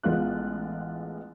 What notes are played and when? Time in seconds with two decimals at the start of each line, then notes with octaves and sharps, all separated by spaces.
0.03 A1 G#3 B3 F4 F#6